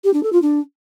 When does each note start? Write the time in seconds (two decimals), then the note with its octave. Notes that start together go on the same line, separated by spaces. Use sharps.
0.04 G4
0.13 D4
0.23 A4
0.32 F4
0.42 D4